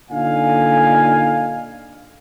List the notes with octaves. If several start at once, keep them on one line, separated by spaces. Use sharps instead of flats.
A#2 D3 D#4 F5 G#5